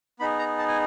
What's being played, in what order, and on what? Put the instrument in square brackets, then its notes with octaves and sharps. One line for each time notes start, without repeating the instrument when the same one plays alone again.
[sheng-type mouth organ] B3 D#4 G#4 B5
A#5
A5
G#5